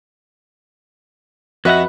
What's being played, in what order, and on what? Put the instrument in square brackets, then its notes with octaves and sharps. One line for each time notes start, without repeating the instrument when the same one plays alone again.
[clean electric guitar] F2 F#5 [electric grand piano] F#4 D#5 E5 [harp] B4